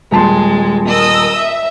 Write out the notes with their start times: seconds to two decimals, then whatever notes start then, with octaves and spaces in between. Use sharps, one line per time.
0.12 D#1 G#3 A5 C6
0.88 A#4 D#5 D#6 E6
1.36 E5